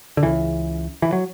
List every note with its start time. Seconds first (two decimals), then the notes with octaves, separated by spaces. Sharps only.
0.17 D3
0.23 C#2 C#3 E3
1.02 E3
1.13 F#3